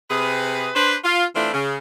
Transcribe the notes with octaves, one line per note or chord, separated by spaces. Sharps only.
C3 G#4 B4
D4 B4 C5
F4
E3 A3 C4 D4 E4 F4
C#3